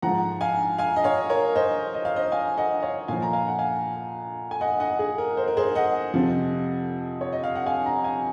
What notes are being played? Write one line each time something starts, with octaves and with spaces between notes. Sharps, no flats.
G#2 F3 F#5 A#5
F5 G#5
F5 G#5
D#5
C#5 F5
A#4 C#5
C5 D#5
D#5
F5
C5 D#5
F5 G#5
D#5 F#5
C#5 F5
A#2 F3 F5 G#5
A#5
F5 G#5
F#5
F5 G#5
G#5
D#5 F#5
D#5 F#5
G#4
A#4
C5
A#4
G#4 C5
D#5 F#5
F2 C3 F3
C#5
D#5
F5
F#5
F5 G#5
F#5 A#5
F5 G#5